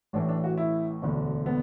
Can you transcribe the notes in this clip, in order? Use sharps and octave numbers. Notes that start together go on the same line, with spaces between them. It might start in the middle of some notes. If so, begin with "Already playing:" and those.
A1 A2 E3 D4
D4
F#4
E4
E1 D2 D3
B3